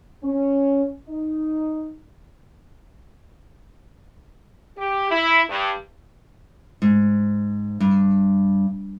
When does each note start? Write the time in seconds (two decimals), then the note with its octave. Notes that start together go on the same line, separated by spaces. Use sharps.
0.23 C#4
1.08 D#4
4.77 G4
5.10 E4
5.48 G2
6.82 G#2
7.80 G2